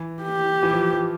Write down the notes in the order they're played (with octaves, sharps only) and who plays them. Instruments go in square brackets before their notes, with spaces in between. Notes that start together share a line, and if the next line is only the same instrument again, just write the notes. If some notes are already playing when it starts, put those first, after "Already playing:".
Already playing: [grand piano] E3
[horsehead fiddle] G4
[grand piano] E3
F3
F3